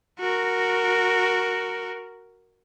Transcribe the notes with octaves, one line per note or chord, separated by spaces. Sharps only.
F#4 A#4